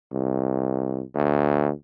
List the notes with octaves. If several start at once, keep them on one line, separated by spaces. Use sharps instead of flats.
C2
D2